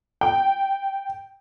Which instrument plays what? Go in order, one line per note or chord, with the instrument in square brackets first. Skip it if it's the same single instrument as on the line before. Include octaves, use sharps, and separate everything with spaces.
[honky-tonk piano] G5